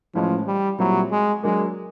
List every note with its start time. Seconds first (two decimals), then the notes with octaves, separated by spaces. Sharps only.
0.15 A2 E3 F3 G#3 C#4
0.47 G3
0.79 A#2 F#3 G3 C4 E4
1.11 G#3
1.43 F#3 G#3 A#3 D4